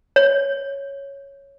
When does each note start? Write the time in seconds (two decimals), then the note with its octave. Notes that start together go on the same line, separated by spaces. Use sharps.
0.16 C#5